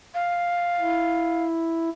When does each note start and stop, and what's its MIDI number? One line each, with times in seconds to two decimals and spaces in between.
0.14 1.44 77
0.80 1.90 64